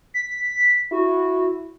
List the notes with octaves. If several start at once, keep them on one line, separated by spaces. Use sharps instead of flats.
B6
E4 F#4